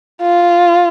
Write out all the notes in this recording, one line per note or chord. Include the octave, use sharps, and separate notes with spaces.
F4